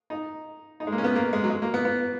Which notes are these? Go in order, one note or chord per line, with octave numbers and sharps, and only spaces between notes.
D#4
D#4
G#3
A#3
C#4
B3
A#3
G#3
F#3
G#3
A#3
B3
B3